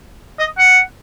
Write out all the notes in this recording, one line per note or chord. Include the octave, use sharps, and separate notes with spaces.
D#5
F#5